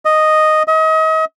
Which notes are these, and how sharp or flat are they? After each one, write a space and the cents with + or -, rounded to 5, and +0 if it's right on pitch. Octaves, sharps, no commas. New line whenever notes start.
D#5 -5
D#5 +35